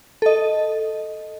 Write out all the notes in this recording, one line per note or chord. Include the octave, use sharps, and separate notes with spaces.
A4 D#5